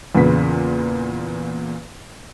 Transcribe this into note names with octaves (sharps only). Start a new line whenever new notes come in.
E2 A#2 C#3 B4 B6